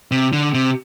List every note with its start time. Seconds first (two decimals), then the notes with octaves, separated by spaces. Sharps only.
0.11 C3
0.33 D3
0.54 C3